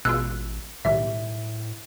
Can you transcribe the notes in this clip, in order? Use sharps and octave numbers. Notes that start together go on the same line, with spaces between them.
A1 B2 G#3 F4 E6 F#6
B1 A2 D#3 G3 E5